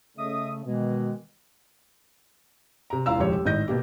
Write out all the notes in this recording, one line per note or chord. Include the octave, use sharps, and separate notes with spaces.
C#3 A3 D#5 E5 D#6
B2 D#3 E3 G#3
C3 A#5
E1 E3 F4 F5 A#5 E6
D#1 C2 F2 G#3 G4 C#5
G4
G#1 A2 D#3 D#5 G6 A#6
B2 A#3 G4